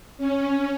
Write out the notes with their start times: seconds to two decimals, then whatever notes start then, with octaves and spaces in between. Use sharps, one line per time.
0.18 C#4